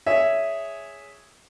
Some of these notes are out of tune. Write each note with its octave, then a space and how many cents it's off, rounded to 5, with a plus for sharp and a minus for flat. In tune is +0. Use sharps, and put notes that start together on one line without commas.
G#4 +0 C#5 +15 E5 +0